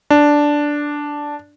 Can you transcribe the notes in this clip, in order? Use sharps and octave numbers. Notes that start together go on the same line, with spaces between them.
D4